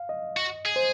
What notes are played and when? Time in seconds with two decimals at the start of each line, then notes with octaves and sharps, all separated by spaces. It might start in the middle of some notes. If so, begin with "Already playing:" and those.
Already playing: F5
0.09 D#5
0.37 F#4
0.66 G#4
0.76 C5